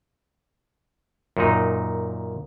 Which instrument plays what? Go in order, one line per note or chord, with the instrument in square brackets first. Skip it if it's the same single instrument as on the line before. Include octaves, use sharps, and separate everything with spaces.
[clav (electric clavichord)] F#2 A#2 D#4